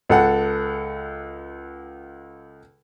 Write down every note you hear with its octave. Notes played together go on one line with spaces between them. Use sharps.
C#2 A4 F#5